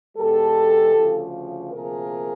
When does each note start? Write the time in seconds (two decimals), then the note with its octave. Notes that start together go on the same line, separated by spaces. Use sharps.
0.17 E2 B2 G#3 G4 A4
0.96 D2 C#3 F3
1.73 D2 C3 F3 A#3 G#4 A#4